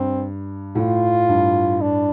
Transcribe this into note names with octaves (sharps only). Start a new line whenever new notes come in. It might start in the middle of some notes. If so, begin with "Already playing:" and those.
Already playing: G2 C4
A2 F4
G2
D4